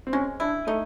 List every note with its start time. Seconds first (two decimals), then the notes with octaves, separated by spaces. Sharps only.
0.07 C4
0.13 G#3 C#4
0.40 D4 E4
0.67 A3 D#4